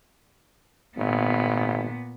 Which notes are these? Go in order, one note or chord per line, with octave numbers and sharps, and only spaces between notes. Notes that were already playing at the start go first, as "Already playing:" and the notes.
G#1 A#2 B3